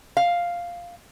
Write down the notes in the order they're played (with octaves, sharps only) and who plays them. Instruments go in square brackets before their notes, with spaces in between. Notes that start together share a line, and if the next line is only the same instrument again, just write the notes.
[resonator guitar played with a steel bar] F5